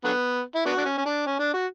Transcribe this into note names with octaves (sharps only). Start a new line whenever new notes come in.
D3 F#3 B3
E4
B3 D4 F#4
D4
C#4
C#4
D4
C#4
D4
F#4